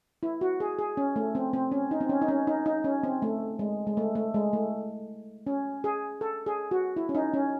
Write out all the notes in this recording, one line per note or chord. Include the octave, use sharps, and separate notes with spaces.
E4
F#4
G#4
G#4
C#4
A3
C4
C4
C#4
D#4
C4
C#4
D#4
C#4
D#4
D#4
C#4
C4
A3
G#3
G#3
A3
A3
G#3
A3
C#4
G#4
A4
G#4
F#4
E4
C#4
D#4
C#4